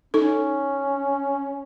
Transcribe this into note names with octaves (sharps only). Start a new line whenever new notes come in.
C#4 D#4 A4